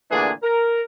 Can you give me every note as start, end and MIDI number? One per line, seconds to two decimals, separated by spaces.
0.11 0.31 46
0.11 0.31 50
0.11 0.31 52
0.11 0.31 57
0.11 0.31 62
0.11 0.31 68
0.43 0.82 70